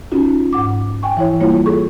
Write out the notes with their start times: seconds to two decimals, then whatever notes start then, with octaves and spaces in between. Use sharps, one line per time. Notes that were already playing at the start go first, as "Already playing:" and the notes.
0.12 C#4 D#4 F4 F#4
0.53 G#2 F#5 D6
1.03 G5 G#5 C#6
1.17 E3 E4 C#5
1.40 G3 A#3 E4 F4 C#5
1.66 G#4 A4 C#6